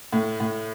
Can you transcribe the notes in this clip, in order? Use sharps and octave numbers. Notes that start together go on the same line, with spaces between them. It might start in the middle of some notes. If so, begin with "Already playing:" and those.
A2
A2